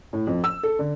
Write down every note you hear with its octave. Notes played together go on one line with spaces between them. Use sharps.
A2
F2
E6
A4
D3